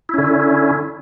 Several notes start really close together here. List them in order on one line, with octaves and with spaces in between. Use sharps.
E4 C#4 D3